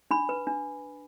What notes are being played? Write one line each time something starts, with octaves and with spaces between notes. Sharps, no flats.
D4 B5
B4
D4